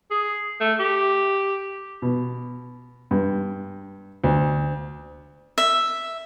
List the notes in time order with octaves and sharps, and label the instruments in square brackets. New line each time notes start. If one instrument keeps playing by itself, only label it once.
[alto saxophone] G#4
A3
G4
[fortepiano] B2
G2
D2
[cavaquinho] E5